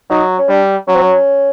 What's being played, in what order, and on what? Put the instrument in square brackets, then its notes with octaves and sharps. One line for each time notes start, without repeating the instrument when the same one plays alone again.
[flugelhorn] F#3 [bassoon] D#4
[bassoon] C#4
[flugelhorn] G3 [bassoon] D4
[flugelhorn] F#3 [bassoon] C#4
[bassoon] C4
C#4